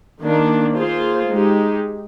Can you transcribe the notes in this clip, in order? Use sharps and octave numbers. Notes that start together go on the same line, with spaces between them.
D#3 A#3 D4
A#3 F4 G#4 C5
G#3 D#4 G4